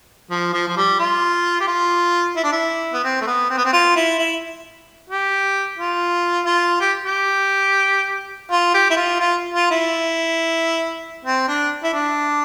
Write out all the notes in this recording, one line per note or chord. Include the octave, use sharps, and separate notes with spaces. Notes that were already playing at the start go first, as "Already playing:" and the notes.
F3
F3
F3
G3
F4
G4
F4
E4
D4
E4
B3
C4
A3
B3
C4
B3
C4
F4
E4
E4
G4
F4
F4
G4
G4
F4
G4
E4
F4
F4
F4
E4
C4
D4
E4
D4